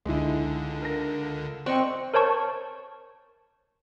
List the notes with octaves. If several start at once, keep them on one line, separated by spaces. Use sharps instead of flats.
C#2 D3 G#3 D#4 E4
A#4 A#6
C4 D5 D#5 G5 C#6 F#6
A#4 C5 C#5 A5 C#6